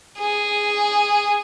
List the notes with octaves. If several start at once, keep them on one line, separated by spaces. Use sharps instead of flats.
G#4